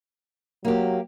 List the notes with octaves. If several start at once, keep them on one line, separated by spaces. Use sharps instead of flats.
F#3 A#3 G4